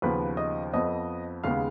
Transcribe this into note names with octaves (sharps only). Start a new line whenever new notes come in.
D#2 C#3 F3 B3 B4
D#5
F2 F3 B3 D#5
D#2 C#3 G#3 B3 F5